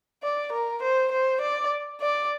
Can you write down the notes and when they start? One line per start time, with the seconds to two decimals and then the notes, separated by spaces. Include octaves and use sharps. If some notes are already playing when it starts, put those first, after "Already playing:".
0.23 D5
0.52 A#4
0.82 C5
1.12 C5
1.41 D5
2.01 D5